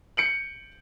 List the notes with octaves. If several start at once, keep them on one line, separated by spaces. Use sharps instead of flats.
G6 C#7 D7 F#7